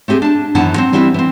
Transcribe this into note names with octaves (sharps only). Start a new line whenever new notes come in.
A3 C4 G4 G#4
D4 A5
F#2 D#3 E3 B3 E4 A5
F#3 C4
E3 G3 C4 E4 B4
E3 C4